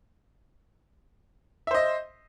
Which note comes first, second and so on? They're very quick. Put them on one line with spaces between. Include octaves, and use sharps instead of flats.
E5 C5 D#5